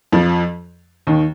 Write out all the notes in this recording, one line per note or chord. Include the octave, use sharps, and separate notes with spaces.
F2 F3
D#2 D#3